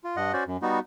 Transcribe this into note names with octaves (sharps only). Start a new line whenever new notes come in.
F4
G2 D#5 F#5
C#4 F#4 C5 D5
F#2
G3 B3 D#4 F#4